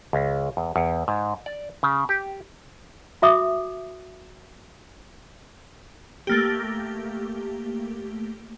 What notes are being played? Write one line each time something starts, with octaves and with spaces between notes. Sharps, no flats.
C#2
E2
E2
G#2
D5
C#3
G4
F#4 E5 D6 D#6
A3 A#3 G4